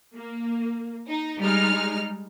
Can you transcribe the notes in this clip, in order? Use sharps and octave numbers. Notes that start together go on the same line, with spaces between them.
A#3
D#4
G3 G#3 D#4 F6